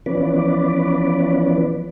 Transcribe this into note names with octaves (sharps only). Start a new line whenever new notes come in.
E3 F3 B3 C#4 B4 D5